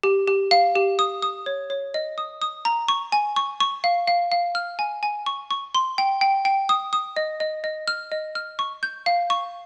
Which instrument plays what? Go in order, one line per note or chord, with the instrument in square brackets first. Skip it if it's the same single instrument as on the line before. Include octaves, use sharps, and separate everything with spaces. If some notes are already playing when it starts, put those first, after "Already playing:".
[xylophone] G4
G4
F5
G4
D#6
D#6
C#5
C#5
D#5
D#6
D#6
A#5
C#6
G#5
C#6
C#6
F5
F5
F5
F6
G#5
G#5
C#6
C#6
C6
G5
G5
G5
D#6
D#6
D#5
D#5
D#5
F6
D#5
F6
C#6
G6
F5
C#6